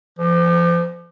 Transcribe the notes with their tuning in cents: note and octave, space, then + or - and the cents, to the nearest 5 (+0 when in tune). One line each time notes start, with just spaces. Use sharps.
F3 -35